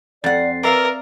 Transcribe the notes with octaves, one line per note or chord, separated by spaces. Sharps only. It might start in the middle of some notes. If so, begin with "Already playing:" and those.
F2 D5 F#5 A6 C7
A#4 B4 D5 E5 F5